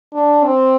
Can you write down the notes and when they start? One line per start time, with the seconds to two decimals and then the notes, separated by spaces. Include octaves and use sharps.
0.13 D4
0.45 C4